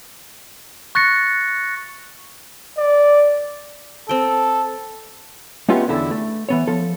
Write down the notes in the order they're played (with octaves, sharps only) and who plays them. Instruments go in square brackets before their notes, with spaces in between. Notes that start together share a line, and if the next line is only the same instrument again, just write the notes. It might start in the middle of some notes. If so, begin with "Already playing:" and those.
[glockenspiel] C#6 F#6 A6 A#6 C#7
[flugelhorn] D5
[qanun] C4 G5 [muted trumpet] A4
[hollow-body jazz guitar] G#3 A3 B3 C#4 F4 G4
E2 D3 E4 A4
A3
E3 B3 C#5
F3 A4